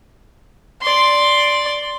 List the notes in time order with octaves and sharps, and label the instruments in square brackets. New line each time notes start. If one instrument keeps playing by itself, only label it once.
[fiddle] D5 C6